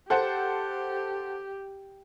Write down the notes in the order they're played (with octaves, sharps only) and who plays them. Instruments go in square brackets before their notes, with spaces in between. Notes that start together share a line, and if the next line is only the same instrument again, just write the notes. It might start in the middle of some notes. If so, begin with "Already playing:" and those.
[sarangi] G4 [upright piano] A4 C5 F#5